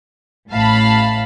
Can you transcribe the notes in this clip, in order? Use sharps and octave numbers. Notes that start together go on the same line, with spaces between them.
A1 A2 F5 A5 B5